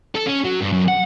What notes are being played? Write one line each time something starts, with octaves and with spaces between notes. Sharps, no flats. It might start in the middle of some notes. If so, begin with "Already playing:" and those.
A4
C#4
F#3
G2
F#2
F#5